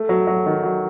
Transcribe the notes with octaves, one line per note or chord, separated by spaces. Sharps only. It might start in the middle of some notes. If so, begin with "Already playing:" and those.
Already playing: A3
F#3
F#3
D#3
F#3